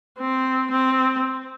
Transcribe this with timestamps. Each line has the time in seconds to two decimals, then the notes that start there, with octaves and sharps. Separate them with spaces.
0.19 C4
0.71 C4